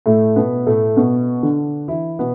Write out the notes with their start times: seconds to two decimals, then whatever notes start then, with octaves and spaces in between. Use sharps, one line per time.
0.06 A2 A3
0.36 B2 B3
0.67 A2 A3
0.97 B2 B3
1.43 D3 D4
1.88 E3 E4
2.19 B2 B3